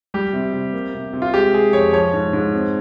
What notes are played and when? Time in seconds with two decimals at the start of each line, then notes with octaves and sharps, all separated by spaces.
0.14 G3 G4
0.33 C3
0.53 C3
0.73 A#3
0.94 C3
1.13 C3
1.22 F4
1.34 G#3 G4
1.54 G#3 G#4
1.73 F2 C#5
1.93 F3 C#5
2.13 G#2
2.33 G#2
2.54 C4